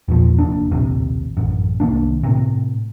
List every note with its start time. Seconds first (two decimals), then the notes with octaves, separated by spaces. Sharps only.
0.08 E2 A#2 F3
0.39 F1 D#2 D4
0.71 A#1 D#2 A2 C3
1.37 A1 F#2
1.80 C2 D#3 A#3 D4
2.23 A2 C3